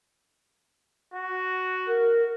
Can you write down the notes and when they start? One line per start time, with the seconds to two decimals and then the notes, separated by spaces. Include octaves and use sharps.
1.14 F#4
1.86 A#4